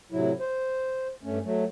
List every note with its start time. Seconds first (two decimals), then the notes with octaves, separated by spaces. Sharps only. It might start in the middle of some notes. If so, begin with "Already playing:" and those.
0.12 A2 C3 F#3 E4
0.40 C5
1.23 G2 A3 C#4
1.44 F#3 A3